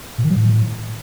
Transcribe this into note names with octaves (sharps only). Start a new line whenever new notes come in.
A#2
D#3
F#3
A2